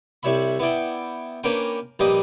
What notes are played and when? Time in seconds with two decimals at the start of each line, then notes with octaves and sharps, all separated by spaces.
0.23 C2 G3 C#5 E5 B5
0.59 B3 E4 D5 G5
1.44 A#3 C#4 D4 A#4 B4 G5
1.99 A#1 G3 A#3 G4 B4 D#5